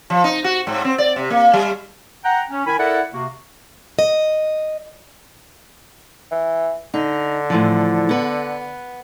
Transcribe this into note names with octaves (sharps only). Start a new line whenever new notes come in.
F3
D#4
F#4
G#2
C4
D5
C3
A#3
G3
F#5 G5 A#5
C#4
D#3 E4 G#5 B5
E4 A4 A#4 D5 E5 F#5
C3 A#3 F#4
D#5
E3
D3 D#4
A2 E3 F3
B3 B4